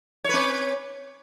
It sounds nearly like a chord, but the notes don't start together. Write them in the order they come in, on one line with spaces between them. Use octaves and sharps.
C#5 B4 C4